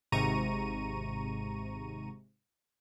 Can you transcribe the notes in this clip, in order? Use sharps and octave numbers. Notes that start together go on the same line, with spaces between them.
G#1 G#2 C3 A#5 C#6 D#7